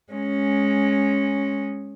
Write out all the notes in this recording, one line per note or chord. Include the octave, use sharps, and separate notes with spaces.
G#3 C#4